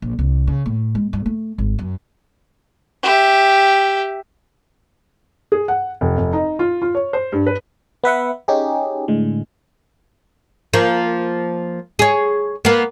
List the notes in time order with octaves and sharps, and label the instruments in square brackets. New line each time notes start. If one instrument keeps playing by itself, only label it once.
[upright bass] A#1
C2
C#3
A2
G#3
G2
A3
G#1
F#2
[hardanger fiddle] G4 E5
[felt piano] G#4
F#5
F1
F1
D#4
F4
F4
C#5
C5
G2
B4
[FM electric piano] B3 B4 E5 F#5
C#4 D#4 G4 G#4
A2 D3 G#3
[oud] F3 A#3
G#4 C#5
A#3 B3